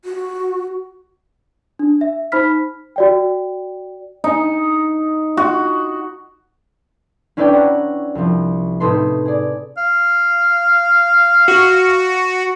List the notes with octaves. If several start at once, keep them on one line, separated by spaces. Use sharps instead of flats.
F#4
D4
E5
D#4 C5 B5 F6 B6
F#4 D5 G5
D#4
F#4
C#4 D4 E4 B4 D5 G5
F#5 A#5 C#6
C2 F3
A2 C3 D#4 A4 B4 C6
G#4 D5
F5
F#4